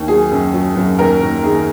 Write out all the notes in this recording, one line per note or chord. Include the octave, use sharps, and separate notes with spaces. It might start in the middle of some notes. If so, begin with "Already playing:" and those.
Already playing: D#2
F#3 G#4
F#2
F#3
F#2
D#2 A#4
D#2
D#3 G#4